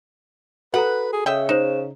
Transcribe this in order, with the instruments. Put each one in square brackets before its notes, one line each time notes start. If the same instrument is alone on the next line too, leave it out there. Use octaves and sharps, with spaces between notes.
[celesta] F#4 A4 A#5 [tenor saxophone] B4 [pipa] F#5
[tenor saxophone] G#4
[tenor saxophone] C#3 [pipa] D#5 E5 G5
[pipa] D#4 [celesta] C5 E7